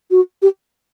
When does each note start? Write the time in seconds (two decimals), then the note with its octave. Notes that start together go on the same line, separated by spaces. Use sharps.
0.11 F#4
0.42 G4